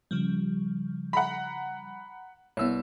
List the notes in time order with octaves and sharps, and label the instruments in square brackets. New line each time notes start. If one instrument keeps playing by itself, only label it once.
[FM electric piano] C#3 F3 G3
[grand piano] F#5 A#5 B5
[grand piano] C2 E6 [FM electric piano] B3 C#5